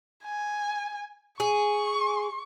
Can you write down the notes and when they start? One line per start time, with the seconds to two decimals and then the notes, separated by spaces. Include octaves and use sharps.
0.24 G#5
1.40 G#4 C#6